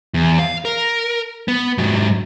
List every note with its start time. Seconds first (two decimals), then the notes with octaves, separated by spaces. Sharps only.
0.14 E2
0.39 F5
0.65 A#4
1.48 B3
1.78 G#2 F#3